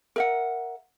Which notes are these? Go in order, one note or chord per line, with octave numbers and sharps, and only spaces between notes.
A#4 E5 F#5